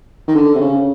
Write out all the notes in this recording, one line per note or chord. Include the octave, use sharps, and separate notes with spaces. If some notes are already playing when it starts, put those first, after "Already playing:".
D#3
D3
C3
C#3